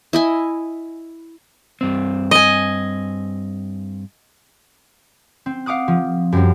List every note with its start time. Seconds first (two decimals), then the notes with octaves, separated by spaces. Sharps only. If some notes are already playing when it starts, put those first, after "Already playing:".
0.13 E4 D#5 G#5
1.81 G2 C4
2.31 D#5 G#5
5.46 C4
5.66 F5 F#5 D6 D#6 F#6
5.88 F3
6.32 F#2 G3 C4